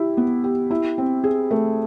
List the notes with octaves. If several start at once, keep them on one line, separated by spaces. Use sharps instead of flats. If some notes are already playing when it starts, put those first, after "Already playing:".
Already playing: E4 G4
B3
G4
E4
C4
G#4
A3